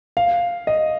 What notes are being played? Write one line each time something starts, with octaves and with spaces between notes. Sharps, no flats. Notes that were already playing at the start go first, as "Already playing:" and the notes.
F5
D#5